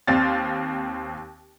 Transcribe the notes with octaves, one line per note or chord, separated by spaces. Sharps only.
D#2 C4 F5 A6